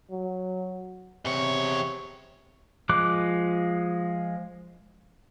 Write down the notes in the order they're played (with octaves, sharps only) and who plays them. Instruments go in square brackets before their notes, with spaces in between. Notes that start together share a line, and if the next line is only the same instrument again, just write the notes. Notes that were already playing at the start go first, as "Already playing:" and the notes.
[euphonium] F#3
[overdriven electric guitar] E2 C#5 [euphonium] C3
[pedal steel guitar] F3 G#3 D6 F#6